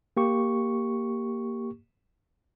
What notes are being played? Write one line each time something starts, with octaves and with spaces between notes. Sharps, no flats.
A#3 G4 C#6